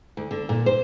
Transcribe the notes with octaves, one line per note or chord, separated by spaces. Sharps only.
D2
D3
A#2
C5